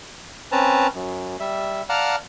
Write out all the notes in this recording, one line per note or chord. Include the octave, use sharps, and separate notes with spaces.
C4 C#4 B4 A5 A#5
F#2
G3 E5
D5 F5 F#5 A5 A#5 F6